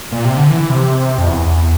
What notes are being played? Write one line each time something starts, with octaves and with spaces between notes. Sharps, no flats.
A#2
C3
D3
E3
C3
F2
E2
E2